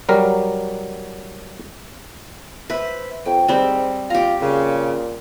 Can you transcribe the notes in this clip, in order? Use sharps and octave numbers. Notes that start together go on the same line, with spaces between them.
F#3 G3 A#4
B4 C5 E5
F2 G5
G#2 G3 C4 E6 G6
F4 G4 A#5
A#2 C#3